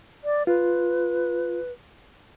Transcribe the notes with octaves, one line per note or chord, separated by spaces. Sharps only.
D5
F4 B4